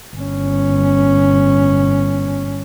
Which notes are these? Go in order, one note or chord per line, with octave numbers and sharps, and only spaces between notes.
G1 C#4